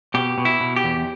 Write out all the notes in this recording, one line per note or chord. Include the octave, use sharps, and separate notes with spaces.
B2 G4
B2
E4
B2
G4
E2